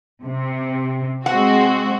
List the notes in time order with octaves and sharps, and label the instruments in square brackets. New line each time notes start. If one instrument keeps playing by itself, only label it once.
[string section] C3
[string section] G#3 C4 F#4 [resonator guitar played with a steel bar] F#5